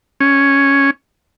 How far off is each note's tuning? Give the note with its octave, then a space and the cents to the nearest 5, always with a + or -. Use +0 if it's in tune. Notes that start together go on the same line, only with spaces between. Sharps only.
C#4 +0